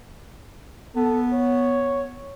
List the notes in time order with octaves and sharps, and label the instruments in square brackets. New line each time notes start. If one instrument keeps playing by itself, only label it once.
[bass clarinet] B3 [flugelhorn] A4
[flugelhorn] C#5